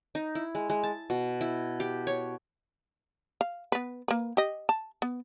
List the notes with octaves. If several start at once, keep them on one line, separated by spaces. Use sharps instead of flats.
D#4
E4
G#3
G#3
A5
B2
E4
G4
C#5
F5
B3 B4
A#3 B4
G4 D#5
A5
B3